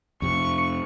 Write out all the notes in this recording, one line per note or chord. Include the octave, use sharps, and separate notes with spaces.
F2 C3 C#6